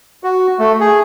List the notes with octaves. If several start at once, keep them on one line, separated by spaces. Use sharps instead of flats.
F#4
A3
G#4